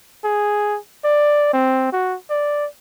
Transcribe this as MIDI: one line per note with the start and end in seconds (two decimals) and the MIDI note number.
0.25 0.78 68
1.04 1.49 74
1.53 1.91 60
1.93 2.16 66
2.30 2.67 74